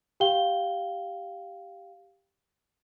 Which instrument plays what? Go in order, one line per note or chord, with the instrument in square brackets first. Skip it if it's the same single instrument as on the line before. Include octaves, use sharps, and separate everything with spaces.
[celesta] G4 F5 G5 G7